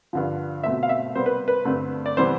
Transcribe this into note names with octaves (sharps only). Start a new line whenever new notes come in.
G2 D3 F3
B2 A3 C4 E5
F5
E5
C3 G3 B3 C5
B4
B4
G2 D3 A3 C4
D5
C3 E3 G3 B3 C5